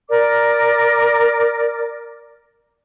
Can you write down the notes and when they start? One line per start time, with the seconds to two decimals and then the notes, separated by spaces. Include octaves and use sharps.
0.09 A#4 D5 D6